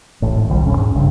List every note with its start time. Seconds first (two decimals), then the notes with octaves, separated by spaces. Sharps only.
0.22 A1 A2
0.36 G#1
0.49 C2 D#3 F#3 G3
0.65 E1 B1 C#4
0.77 G#2
0.95 A1 G2 C#3